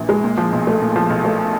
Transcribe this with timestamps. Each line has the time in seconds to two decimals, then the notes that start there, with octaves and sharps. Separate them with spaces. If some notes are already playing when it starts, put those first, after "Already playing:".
Already playing: A#1 E3
0.09 G#3
0.24 A#2
0.37 F3
0.52 B1
0.67 A3
0.82 A#2
0.96 F3
1.10 B1
1.25 A3